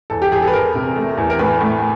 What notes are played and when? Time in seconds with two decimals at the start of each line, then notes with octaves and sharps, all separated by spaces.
0.10 E2 A4
0.22 G4
0.32 E2 G#4
0.43 A4
0.48 B4
0.53 E2 A#4
0.75 C3
0.96 A3
1.17 E2
1.30 A#4
1.39 A2 B4
1.61 A2